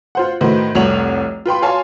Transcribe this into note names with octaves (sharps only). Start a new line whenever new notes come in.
F4 C5 F#5
A2 D#3 F#4 B4 C5
F1 C2 C#5 F#5 F7 F#7
F4 B4 G5 C6
C#5 F5 G#5 A5 C6